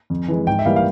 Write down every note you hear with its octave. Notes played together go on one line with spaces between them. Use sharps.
F2
E3 G#3
G#2 G5
E5
E3 G3 A#3 F5
F5